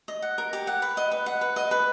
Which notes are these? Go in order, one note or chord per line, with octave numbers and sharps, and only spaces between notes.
D#5
F#5
A#4
G4
F#5
B4
D#5
B4
F#5
B4
D#5
B4